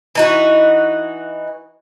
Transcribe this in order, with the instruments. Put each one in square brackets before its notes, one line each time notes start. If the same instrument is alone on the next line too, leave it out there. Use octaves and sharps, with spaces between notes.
[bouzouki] E3 D#4 F#4